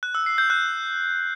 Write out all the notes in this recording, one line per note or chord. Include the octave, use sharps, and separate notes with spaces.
F#6
E6
C7
G6
F#6